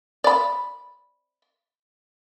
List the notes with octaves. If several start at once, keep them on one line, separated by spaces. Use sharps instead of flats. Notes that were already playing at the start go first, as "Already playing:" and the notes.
D5 B5